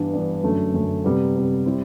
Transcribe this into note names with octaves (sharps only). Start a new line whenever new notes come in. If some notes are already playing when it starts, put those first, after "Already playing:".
Already playing: G2 E3 B3 D4
G2 E3 B3 D4
F#2 D3 A3
F#2 D3 A3
C3 G3 B3
C3 G3 B3
G3 C4 E4